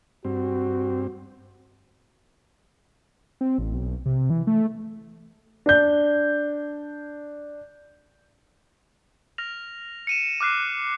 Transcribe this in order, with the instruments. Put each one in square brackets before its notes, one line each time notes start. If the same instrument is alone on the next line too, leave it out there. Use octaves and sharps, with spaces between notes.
[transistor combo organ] G2 C4 [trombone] F#4
[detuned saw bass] C4
A1
B1
C3
E3
A3
[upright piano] D4 G6
[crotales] F6 A#6 F7
C#7 D#7 E7
D6 F6 F#6 C7 D#7